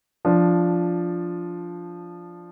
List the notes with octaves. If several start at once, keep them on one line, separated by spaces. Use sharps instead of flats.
F3 D4